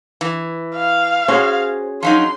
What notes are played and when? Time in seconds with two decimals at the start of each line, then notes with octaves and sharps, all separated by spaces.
0.21 E3
0.75 F5
1.28 C#4 F#4 G#4 C5
2.03 F3 F#3 D#4 C6